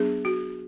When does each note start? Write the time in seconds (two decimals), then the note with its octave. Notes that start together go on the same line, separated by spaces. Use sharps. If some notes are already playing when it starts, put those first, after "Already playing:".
Already playing: F#3 B3 D4 G#4
0.25 F#4